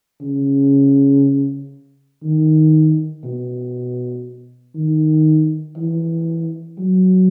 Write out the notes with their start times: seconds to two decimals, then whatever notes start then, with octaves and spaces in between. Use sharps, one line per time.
0.21 C#3
2.23 D#3
3.24 B2
4.75 D#3
5.77 E3
6.78 F#3